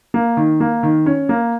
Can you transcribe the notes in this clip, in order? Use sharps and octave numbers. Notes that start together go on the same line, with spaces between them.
A#3
D#3
A#3
D#3
C#4
A#3